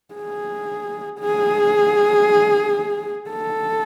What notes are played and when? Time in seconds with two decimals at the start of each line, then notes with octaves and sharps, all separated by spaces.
0.15 G#4
1.20 G#4
3.30 A4